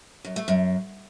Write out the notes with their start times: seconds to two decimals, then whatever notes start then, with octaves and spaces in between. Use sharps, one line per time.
0.25 F#2
0.36 A3
0.48 F#2